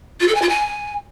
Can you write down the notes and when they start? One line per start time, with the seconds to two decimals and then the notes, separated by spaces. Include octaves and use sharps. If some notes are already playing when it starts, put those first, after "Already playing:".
0.20 F4
0.28 A4
0.35 G#5
0.42 F4
0.49 G#5